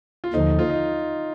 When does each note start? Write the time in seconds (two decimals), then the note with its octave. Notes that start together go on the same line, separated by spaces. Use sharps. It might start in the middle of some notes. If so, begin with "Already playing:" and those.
0.24 F4
0.34 D#2 D3 F3 D#4
0.59 F4
0.70 D#4